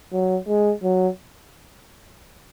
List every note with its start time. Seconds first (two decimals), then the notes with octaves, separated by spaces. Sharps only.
0.12 F#3
0.48 G#3
0.83 F#3